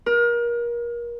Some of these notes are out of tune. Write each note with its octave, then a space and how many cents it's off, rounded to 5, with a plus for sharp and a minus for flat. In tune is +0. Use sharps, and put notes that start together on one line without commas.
A#4 +30